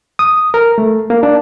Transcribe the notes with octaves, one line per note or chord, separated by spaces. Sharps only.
D#6
A#4
A3
A#3
D4